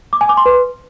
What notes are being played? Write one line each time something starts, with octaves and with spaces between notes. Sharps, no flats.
D6
G#5
D6
C6
B4